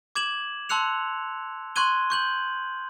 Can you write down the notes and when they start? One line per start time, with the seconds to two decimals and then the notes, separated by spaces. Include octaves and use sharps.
0.15 D6 G#6 E7 F#7
0.69 A5 C6 E6 F#6 C#7 F7
1.76 C6 C#6 F#6 G#6 D#7 G7
2.10 C#6 G6 F#7